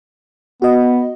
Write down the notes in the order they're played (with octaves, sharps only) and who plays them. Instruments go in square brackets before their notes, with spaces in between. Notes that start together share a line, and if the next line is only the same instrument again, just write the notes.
[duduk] B3 [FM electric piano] F#4 D#5